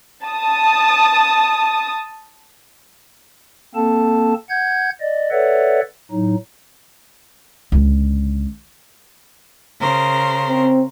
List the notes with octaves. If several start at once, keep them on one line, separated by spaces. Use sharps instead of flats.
A5 D#6
A#3 C4 A4 A5
F#5 G6 G#6
D5 D#5
A4 B4 C#5 D5 E5 F#5
A2 F#3 D#4
C#2 D3
C#3 A#4 C5
C4